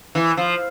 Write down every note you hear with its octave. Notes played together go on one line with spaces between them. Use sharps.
E3
F3